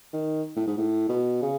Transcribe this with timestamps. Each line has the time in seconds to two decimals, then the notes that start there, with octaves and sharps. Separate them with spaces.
0.13 D#3
0.56 A2
0.67 G#2
0.77 A2
1.09 B2
1.42 C#3